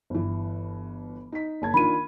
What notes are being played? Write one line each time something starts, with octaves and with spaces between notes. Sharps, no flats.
G1 E3
D#4 B6
F#1 A5 G#6
D#3 D4 F4 B5 D#7